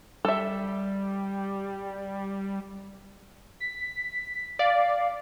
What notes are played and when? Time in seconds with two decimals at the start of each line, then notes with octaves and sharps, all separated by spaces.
0.25 G3 A4 E5
3.60 B6
4.59 D5 F5